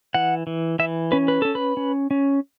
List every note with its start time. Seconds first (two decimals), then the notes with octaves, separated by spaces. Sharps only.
0.14 E3 F#5
0.47 E3
0.79 E3 E5
1.12 C#4 B4
1.28 B4
1.42 C#4 A4
1.55 B4
1.77 C#4
2.11 C#4